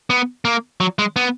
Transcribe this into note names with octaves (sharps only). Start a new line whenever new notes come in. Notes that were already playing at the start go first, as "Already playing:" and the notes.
B3
A#3
F#3
G#3
B3